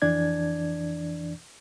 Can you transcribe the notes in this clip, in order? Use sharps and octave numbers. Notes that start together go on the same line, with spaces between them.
F2 E3 D4 D5 G#6